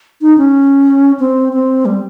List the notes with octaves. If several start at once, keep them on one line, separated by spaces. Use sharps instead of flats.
D#4
C#4
C4
C4
G3